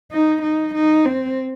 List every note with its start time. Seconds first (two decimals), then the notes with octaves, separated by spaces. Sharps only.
0.12 D#4
0.42 D#4
0.74 D#4
1.05 C4